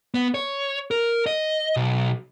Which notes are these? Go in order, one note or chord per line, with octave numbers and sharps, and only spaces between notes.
B3
C#5
A#4
D#5
B1